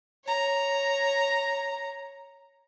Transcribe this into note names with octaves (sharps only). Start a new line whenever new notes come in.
C#5 A#5